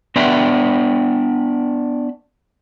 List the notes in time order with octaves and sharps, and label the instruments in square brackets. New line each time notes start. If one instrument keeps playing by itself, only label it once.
[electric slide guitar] B3 D4 B4 E5 G5